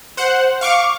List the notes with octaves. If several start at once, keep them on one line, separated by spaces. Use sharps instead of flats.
C5 F#5
F5 C#6 D6